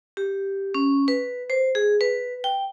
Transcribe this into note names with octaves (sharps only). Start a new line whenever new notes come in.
G4
C#4
B4
C5
G#4
B4
G5